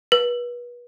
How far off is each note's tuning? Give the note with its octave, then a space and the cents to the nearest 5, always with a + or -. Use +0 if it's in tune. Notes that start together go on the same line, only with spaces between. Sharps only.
B4 -30